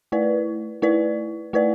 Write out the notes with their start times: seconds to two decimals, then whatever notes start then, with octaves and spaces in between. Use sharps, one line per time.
0.12 A3 E4 B4 D5
0.82 A3 E4 B4 D5
1.53 A3 E4 B4 D5